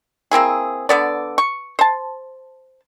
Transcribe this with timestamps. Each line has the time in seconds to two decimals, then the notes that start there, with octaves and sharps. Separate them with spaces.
0.31 A#3 C4 E4 G#4
0.89 D3 B3 D5
1.38 C#6
1.79 C5 A5